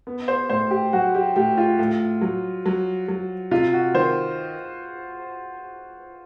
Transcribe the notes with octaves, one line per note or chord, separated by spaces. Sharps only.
B3
C5
A2 C5
G4
F#3 F#4
G4
A2 G4
F4
A2
F#3
F#3
F#3
C3 F4
F#4
D#3 C5